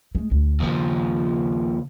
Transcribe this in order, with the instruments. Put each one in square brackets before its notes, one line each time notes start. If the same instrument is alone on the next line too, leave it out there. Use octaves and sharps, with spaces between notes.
[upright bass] G#3 A3
D2
[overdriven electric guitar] D#2 F3 [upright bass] C#3 D4